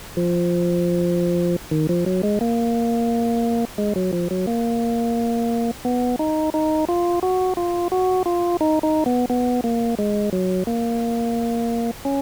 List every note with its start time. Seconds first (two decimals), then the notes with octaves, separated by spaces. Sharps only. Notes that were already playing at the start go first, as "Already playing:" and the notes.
0.17 F3
1.71 D#3
1.89 F3
2.06 F#3
2.23 G#3
2.41 A#3
3.78 G#3
3.96 F#3
4.13 F3
4.31 F#3
4.47 A#3
5.85 B3
6.19 D#4
6.54 D#4
6.89 F4
7.23 F#4
7.57 F4
7.92 F#4
8.26 F4
8.61 D#4
8.83 D#4
9.06 B3
9.30 B3
9.64 A#3
9.99 G#3
10.33 F#3
10.67 A#3
12.05 C#4